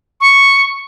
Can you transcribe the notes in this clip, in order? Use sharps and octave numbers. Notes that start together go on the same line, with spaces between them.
C#6